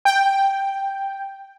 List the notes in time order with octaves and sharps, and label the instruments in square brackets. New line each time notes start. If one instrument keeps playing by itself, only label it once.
[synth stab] G5